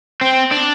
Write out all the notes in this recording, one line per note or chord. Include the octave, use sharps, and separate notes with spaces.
C4
D4